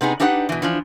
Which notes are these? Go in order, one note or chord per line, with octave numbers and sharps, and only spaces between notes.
C3 B3 D#4 G#4
D4 D#4 G4 B4 E5 F#5
B2 E3
E3 F3 D4